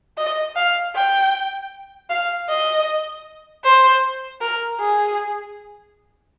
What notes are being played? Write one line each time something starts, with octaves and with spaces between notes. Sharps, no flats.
D#5
F5
G5
F5
D#5
C5
A#4
G#4